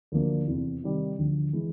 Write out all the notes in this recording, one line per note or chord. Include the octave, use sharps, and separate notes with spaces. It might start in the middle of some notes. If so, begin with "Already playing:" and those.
D2 D3 F3 A#3 D4
E2 C3 E3
C3 D#3 G3
D2 D3 F3
E3 G#3